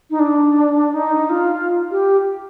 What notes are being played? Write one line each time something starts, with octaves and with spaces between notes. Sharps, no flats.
D#4
D4
D#4
F4
G4